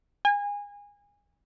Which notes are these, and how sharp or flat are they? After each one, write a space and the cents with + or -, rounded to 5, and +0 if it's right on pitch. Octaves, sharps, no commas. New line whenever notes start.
G#5 -25